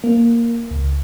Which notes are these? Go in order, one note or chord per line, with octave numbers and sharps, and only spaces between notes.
A#3
C#2